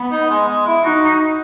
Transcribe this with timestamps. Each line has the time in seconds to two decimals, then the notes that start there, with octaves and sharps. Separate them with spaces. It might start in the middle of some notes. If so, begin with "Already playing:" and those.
Already playing: B3
0.11 D#4
0.29 G#3
0.48 G#3
0.66 E4
0.84 D#4 F#4